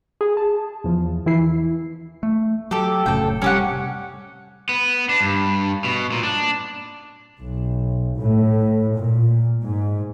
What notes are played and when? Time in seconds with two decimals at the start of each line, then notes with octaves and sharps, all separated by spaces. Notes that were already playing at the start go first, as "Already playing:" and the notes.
0.21 G#4 G#5
0.37 A5
0.84 E2 F3
1.26 E3 E4 C7
2.23 A3
2.71 F#3 G4 A4
3.06 F1 A2 C#3 A4 G5
3.42 C3 G3 C#4 G4 F#5
4.69 B3
5.09 D4
5.21 G2
5.84 B2
6.12 A#2
6.23 D4
7.38 B1
8.18 A2
8.94 A#2
9.63 G#2